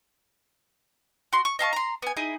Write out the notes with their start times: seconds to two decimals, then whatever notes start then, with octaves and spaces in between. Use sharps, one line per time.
1.33 F#4 C6
1.45 C#6
1.59 D#5 F5 A5 C#6
1.73 A#5 C6
2.02 B3 G#5
2.17 D#4 E4 G#4